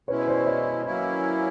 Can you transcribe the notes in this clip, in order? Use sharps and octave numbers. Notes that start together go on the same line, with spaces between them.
B2 G#3 C#4 E4 B4 C#5
C5 D5
C#5 D#5
F#3 A#3 C#4 E4